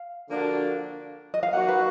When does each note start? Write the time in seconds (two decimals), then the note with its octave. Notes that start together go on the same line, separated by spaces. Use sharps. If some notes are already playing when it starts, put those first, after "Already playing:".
Already playing: F5
0.28 D3 F3 A#3 D4 F#4
1.34 D#5
1.43 F5
1.52 F#3 A#3 D#4 F#4 F#5
1.68 B4